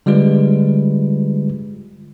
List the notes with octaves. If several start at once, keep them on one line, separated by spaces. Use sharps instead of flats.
D3 G3 G#3 F4 B4